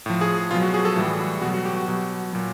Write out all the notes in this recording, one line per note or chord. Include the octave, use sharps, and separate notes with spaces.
A2 F3
G#4
B2 F#3 F4
F#4
G#4
A4
A2 E3 G3
F#4
B2 F#3 F#4
F#4
G4
F#4
B2 F#3 F#4
A#2 F#3